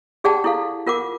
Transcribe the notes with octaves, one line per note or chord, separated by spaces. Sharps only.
G4 G#4 D5 F#5 G5 A5
E4 A4 F5
F4 A#4 F#5 D6